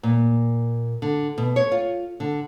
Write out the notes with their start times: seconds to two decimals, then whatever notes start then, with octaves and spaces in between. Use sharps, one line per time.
0.03 A#2
1.02 D3
1.38 B2
1.56 C#5
1.72 F4
2.20 D3